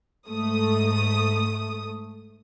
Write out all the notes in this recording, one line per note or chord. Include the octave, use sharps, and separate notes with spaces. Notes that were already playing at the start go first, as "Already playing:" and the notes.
G#2 A3 D#6